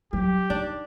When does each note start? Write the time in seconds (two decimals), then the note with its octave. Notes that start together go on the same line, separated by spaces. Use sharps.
0.13 F#3 G4
0.50 D4 D#4